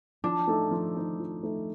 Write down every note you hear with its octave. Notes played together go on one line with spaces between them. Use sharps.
F3 D4
A3 D#4 A4
F3
A3 D#4 A4
F3
A3 D#4 A4